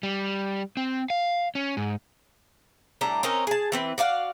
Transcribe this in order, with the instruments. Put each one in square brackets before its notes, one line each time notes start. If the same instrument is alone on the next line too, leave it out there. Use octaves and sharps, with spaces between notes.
[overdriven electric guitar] G3
C4
F5
C#4
G#2
[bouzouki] A2 G3 D4 A#5
C4 C#4 D#4 A#4
G#4 A5
E3 C4 B4
F#4 D5 F5 F#5